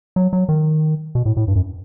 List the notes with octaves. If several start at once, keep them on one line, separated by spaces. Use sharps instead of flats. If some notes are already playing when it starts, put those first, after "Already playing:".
F#3
F#3
D#3
B2
A2
A2
G2
F#2